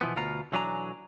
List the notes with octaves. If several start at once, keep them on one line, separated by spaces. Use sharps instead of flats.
B2 E3 F3 B3
D2 B2 F4 F5 A#5
B1 E3 F#3 D4 G#5 A#5